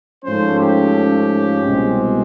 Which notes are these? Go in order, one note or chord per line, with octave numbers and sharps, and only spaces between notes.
G#2 F3 A3 C#4 C5
G4
C2 B2 G#3 C4